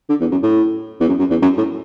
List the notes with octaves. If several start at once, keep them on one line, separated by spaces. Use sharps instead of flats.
D3
E2
F#2
A2
E2
F#2
F#2
E2
F#2
A2